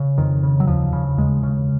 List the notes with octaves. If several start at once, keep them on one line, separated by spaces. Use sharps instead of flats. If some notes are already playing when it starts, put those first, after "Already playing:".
Already playing: C#3
F2 D#3
C#3
F#3
D#2 F3
C#3
D#2 G#3
C#3